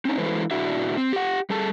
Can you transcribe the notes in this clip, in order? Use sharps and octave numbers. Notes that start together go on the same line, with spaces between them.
C4 C#4 D#4
E3 G#3 E4 A4 B4 C5
A#2 D4 E4 F#4 E5
C4
G4 F#5
G3 G#4 A4 A5